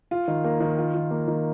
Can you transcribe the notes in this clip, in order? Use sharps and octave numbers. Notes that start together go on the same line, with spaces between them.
F4
D#3
A#3
D#3
F4
D#3
A#3
D#3